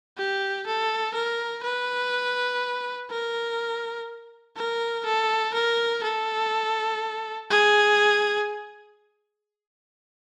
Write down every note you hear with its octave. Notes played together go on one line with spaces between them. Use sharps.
G4
A4
A#4
B4
A#4
A#4
A4
A#4
A4
G#4